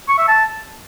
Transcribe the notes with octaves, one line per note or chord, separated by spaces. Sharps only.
C#6
E5
A5